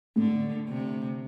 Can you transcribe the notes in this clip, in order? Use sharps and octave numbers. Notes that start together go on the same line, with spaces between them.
A2 D3
C3